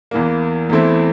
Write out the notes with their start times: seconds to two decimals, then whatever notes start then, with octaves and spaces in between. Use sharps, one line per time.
0.11 E2 E3 A#3
0.70 E2 E3 A3 C4 E4